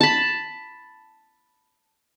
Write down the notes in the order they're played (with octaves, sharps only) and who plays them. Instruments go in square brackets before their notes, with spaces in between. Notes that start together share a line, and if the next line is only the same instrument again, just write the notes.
[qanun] A5 B5